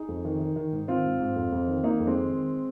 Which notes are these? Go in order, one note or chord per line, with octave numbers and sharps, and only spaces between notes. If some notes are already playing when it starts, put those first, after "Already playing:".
Already playing: D#4 G#4
F2
D#3
D#3
D#3
G#2
D#3 C4 F4
G#2
G#2
F2
F2
D#3
D#3 A#3 D#4
F2
G#3 C4
D#3
D#3